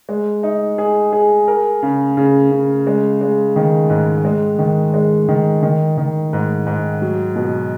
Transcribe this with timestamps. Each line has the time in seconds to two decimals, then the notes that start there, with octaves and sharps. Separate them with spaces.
0.09 G#3
0.43 D#4
0.78 G#4
1.13 G#4
1.48 A#4
1.83 C#3
2.17 C#3
2.51 C#3
2.87 G#3
3.21 G#3
3.56 D#3
3.90 G#2
4.25 G#3
4.59 D#3
4.94 G#3
5.28 D#3
5.63 D#3
5.98 D#3
6.33 G#2
6.67 G#2
7.02 F#3
7.36 B2